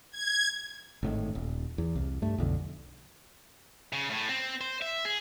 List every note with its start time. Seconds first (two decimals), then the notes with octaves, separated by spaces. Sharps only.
0.11 G#6
1.03 G#1 A2 D#3
1.35 D#1
1.78 E2
1.95 C2
2.22 G2 A3
2.38 B1 F2 D3
3.93 C#3
4.10 A2
4.29 C4
4.61 C5
4.82 E5
5.05 G#4